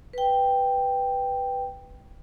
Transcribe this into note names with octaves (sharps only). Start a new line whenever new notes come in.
B4 G5